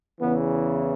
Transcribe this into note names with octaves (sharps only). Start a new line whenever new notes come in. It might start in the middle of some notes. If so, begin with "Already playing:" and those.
E2 C#3 E3 B3